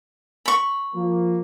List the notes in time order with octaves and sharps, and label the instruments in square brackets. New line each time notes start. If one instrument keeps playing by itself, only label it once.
[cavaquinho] B5 C#6
[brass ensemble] F3 A#3